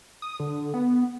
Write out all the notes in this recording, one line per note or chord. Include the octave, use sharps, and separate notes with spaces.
D#6
D3
B3